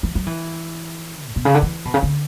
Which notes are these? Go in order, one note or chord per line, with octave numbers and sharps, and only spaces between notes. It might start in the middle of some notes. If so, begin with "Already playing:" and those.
E3
F#3
E3
A2
B2
C#3
D3
E3
B2
C#3
D3